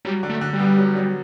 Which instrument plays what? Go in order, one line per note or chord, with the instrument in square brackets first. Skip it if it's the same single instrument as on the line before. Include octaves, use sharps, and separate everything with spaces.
[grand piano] F#3 [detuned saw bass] G3
[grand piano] D3
[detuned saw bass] A3
[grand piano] D3
[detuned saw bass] G3
[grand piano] B3
F#3
F#3